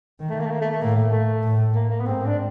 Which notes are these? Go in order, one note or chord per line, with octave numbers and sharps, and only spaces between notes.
D#3
A3
A#3
A3
A#3
A3
A3
A2 A#3
A3
A3
A2
A#3
A#3
B3
G#2 C4
D4